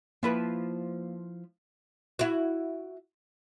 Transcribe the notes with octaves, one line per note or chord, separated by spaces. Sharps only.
F3 A#3 E4 B4
E4 F#4